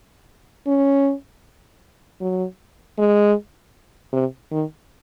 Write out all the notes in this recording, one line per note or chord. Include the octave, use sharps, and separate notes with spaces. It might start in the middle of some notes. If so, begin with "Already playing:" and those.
C#4
F#3
G#3
C3
D#3